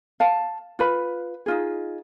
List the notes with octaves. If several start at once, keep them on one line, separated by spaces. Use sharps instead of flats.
F5 A5
F4 B4 B5
D#4 F4 G#4